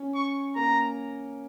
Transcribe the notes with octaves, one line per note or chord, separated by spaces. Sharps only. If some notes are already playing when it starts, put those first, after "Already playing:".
Already playing: C#4
C#6
A#3 A#5